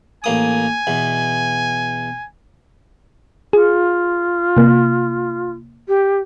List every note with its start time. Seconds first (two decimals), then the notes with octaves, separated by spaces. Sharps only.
0.24 A1 A#3 G#5 D#6
0.87 E2 B2
3.53 F4 G#4
4.57 C3 A#3
5.88 G4